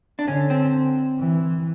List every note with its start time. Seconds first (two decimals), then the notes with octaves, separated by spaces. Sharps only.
0.19 D4
0.28 D3 C#4
0.50 C4
1.19 E3